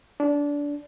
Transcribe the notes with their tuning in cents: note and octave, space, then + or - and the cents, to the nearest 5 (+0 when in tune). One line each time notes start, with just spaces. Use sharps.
D4 -20